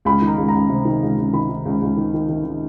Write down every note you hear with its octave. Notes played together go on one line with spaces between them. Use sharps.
C#2 B5
D#3
A#5
C#2
A#5
C#2
C3
D#3
C#2
C#2
D#3 B5
D#3
C#2
C#2
D#3
D#3
D#3
D#3